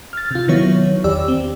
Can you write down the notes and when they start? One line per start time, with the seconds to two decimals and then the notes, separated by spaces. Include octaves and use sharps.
0.13 F6 A6
0.31 C3 F4
0.48 D#3 F#3 B3 E4 C#5
1.04 E2 G4 D5 E6
1.28 C4